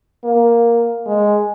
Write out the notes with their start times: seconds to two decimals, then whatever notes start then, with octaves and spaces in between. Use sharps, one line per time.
0.24 A#3
1.06 G#3